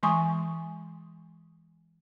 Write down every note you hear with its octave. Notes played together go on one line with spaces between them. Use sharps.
E3 G#3 G#5 C6 C#6 D#6